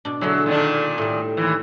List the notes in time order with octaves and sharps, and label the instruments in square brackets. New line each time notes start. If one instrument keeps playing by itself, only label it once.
[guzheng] B2 D4
[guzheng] D3 G#3 E4 [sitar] F#3
[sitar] A#2 D#3 D4
[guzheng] A2 G3
[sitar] D#2 E3